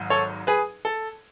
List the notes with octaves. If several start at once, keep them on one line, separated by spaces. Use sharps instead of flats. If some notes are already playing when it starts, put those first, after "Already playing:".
Already playing: G#1 G#2 F#3
A4 C#5
G#4 B4
A4